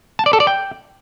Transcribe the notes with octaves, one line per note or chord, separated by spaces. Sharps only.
A5
D5
A4
D5
G5